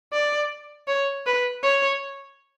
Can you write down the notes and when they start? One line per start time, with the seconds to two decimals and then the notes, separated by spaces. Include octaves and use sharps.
0.13 D5
0.88 C#5
1.26 B4
1.63 C#5